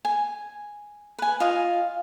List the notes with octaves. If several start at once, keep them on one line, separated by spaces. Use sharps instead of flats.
G#5
B4 G#5
F4 D#5 F5 G#5